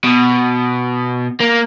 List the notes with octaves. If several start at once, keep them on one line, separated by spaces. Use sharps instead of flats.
B2
A#3